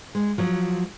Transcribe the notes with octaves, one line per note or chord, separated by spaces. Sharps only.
G#3
F3 F#3